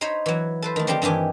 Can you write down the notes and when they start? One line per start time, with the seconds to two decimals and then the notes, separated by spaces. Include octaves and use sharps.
0.01 D#4 C5 C#5 D#5 B5
0.26 E3 F#3
0.62 A4 B4 C5
0.76 D#3 A3
0.87 D3 F3 C4 D4 G4
1.02 G2 D#3 E3 G4 G#5